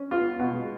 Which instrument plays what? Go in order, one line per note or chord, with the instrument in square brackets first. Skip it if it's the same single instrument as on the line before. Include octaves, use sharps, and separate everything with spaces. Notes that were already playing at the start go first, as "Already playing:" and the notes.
Already playing: [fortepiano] C#4
[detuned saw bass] B3 [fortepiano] F4
[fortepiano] B2
[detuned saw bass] G#3